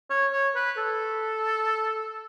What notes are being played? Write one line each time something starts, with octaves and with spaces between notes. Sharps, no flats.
C#5
C#5
B4
A4